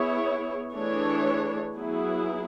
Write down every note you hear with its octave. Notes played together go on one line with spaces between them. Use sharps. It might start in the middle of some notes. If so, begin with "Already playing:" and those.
Already playing: B3 E4 G#4 C#5
E3 A3 D4 G#4 C#5
F#3 B3 E4 G#4